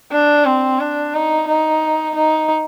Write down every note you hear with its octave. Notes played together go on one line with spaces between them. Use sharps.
D4
C4
D4
D#4
D#4
D#4